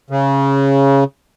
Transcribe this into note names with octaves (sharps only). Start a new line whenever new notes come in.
C#3